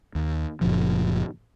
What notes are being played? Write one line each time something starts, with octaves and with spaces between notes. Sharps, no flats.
D#2
F#1 C#2 A#2 F3